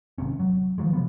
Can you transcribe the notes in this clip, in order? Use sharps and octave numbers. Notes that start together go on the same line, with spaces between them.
G#1 C3 C#4
F#3
D#3 F3 F#3 G#3
C3 F3 B3